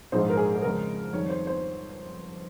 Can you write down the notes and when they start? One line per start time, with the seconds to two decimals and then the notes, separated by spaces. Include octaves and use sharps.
0.12 A#1 G#2 F3 G#3 C5
0.30 A#4
0.37 G#4
0.55 G#4
0.62 F2 C#3 G#3 A#4
1.13 F2 D#3 G3 C#5
1.30 C5
1.47 C5